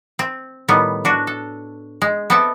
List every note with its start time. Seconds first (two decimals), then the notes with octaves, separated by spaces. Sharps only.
0.19 C4
0.68 A2 D#3 G3 B3
1.05 D4 F#4
1.27 A4
2.02 G#3
2.30 B3 C4 A4 D5 E5